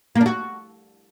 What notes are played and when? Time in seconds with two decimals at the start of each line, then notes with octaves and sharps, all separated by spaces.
0.15 A#3
0.21 D4
0.26 F#4